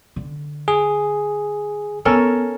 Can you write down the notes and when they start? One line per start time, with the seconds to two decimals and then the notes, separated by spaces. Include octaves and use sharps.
0.16 D3
0.68 G#4
2.05 B3 C#4 A4 A#4